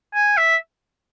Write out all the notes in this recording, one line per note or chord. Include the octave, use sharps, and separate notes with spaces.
G#5
E5